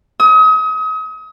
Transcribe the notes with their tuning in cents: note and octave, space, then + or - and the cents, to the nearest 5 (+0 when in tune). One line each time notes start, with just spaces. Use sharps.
D#6 +35